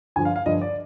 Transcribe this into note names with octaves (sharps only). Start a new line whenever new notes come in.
G2 D3 F3 G#5
F5
F5
G2 D3 F3 D#5
D5